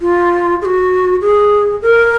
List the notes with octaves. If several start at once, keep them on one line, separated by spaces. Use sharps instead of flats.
F4
G#4
F#4
G#4
A#4